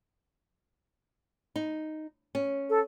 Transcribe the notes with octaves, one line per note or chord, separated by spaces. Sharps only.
D#4
C#4
A4